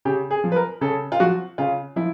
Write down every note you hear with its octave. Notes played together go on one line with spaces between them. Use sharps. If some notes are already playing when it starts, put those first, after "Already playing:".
C#3 G4
G#4
F3
B4
A#4
C#3 A4
F4
F3 F#4
C#3 F4
F3 E4